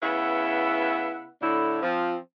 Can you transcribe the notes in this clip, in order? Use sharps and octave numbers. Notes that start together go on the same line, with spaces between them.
C#3 B3 E4 B4 E5 F#5
A2 D3 E4
F3 C4